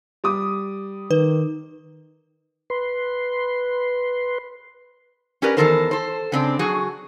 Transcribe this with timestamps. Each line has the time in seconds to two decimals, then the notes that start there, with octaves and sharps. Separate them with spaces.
0.24 G3 D6 D#6
1.11 D#3 B4
2.70 B4 C6
5.42 C#4 G4 A#4 B4 D5
5.57 E2 C3 D#3 A4 A#4 C5
5.91 A4 C5
6.32 C#3 C4 D4
6.59 F#3 F#4 G#4